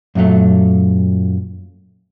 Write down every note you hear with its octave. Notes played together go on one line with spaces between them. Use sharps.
F#2 A#2 D3 F#3 A3